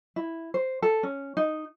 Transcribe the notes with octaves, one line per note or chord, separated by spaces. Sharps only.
E4
C5
A4
C#4
D#4